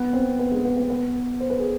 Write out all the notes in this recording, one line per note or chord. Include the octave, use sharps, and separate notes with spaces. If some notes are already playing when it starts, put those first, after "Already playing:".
Already playing: B3 B4
C4 C5
B3 B4
G#3 G#4
B3 B4
B3 B4
B3 B4
C5
B4
G#4